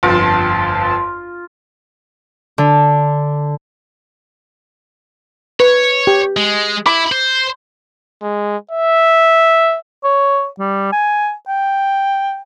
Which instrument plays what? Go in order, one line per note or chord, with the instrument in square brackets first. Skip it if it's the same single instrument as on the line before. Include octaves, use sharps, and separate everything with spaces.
[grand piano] G1 F2 [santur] F4 [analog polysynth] A5 C6
[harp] D3
[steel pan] B4 [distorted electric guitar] C#5
[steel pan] G4
[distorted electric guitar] G#3
[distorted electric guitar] E4 [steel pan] B5 D6
[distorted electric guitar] C5
[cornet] G#3
E5
[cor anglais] C#5
G3
G#5
G5